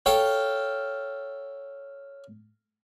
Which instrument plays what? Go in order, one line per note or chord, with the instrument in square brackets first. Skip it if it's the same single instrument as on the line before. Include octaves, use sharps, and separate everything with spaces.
[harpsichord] A4 F5 G5 [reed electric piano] C#5